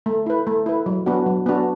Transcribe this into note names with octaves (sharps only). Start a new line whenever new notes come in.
A3
E4 B4
A3
E4 B4
F#3
B3 D4 F#4
F#3
B3 D4 F#4